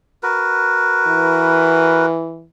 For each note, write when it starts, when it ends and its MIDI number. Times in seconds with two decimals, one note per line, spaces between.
0.23 2.06 66
0.23 2.06 70
0.23 2.06 71
1.07 2.45 52